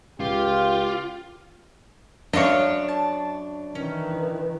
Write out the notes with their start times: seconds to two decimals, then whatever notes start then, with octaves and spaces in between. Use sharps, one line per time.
0.20 C#2 F4 G4
2.33 F#2 D4 C#5 D#5 F5 C#6
2.88 A5
3.75 D#3 E3 C#4